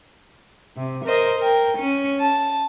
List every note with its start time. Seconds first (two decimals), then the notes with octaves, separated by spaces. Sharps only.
0.76 C3
1.05 A#4 C5 D#5
1.39 A#4 G5
1.79 C#4
2.20 A5